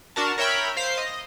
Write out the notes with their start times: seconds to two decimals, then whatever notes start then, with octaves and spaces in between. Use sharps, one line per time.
0.16 D4 F#4 A#4 A5
0.38 A#4 C#5 E5 G5 B5
0.77 C5 F5 B6 C7
0.98 D#5